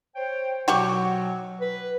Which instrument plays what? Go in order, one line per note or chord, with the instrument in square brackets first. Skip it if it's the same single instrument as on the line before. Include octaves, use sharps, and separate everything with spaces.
[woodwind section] C5 C#5 G5
[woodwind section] B2 F#3 [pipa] F#4 G4 C#6
[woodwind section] B4